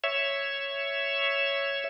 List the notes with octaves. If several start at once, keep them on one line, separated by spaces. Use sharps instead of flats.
C#5 E5